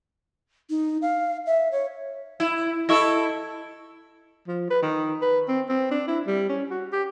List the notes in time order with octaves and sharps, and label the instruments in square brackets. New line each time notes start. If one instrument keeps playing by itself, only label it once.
[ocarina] D#4
F5
E5
C#5
[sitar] E4
[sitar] E4 A4 [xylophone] D#5 C#6 E6
[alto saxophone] F3
B4
D#3
B4
C4
C4
D4
E4
G3
C#4
F#4
G4